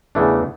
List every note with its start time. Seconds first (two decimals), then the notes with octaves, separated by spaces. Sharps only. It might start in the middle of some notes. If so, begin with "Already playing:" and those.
0.15 E2 C#3 E3 A3 D4